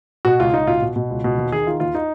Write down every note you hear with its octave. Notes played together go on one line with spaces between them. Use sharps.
B2 F#4
C#2 F4
C#2 D#4
B2 F4
B2
B2
C#2
B2
D#2
D#3 G#4
D#3 F4
D#2 F4
D#4